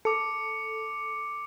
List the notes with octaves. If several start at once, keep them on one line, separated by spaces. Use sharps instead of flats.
A4 D6 C#7